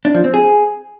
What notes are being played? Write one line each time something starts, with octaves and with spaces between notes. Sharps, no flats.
D4
F3
C4
G#4